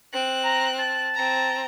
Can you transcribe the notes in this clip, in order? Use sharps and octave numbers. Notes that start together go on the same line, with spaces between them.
C4 F#6
A#5
A5
C4 A#5